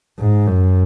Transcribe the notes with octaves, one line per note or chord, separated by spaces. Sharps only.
G#2
F#2